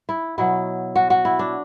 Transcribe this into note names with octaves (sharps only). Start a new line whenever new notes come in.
E4
B2 F#3 E4
F#4
F#4
E4
D4